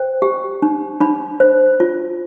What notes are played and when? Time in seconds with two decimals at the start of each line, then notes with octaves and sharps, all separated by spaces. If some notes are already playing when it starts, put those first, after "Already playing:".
Already playing: C5 G5
0.22 G4
0.62 D4
1.00 D4 B5
1.40 C5
1.80 F4